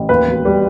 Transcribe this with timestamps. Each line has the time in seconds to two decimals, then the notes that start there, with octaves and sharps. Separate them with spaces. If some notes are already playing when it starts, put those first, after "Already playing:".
Already playing: A1
0.09 D#2 B4
0.27 E1
0.45 G3